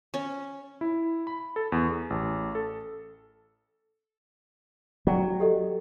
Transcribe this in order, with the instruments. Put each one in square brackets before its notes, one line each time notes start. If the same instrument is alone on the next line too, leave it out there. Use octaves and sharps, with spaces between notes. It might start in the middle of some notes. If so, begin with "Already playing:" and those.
[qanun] C#4
[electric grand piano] E4
B5
A4
E2
G#4
A1
A4
[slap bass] F#3 [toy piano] D5 F#5 G5
[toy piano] G4 A4 D#5